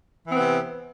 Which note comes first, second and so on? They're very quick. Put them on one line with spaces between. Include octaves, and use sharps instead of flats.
E3 C4 B3 C3